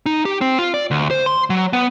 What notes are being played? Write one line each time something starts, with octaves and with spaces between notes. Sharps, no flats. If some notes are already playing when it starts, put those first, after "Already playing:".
D#4
G4
C4
F4
D5
D2
C5
C6
F#3
B3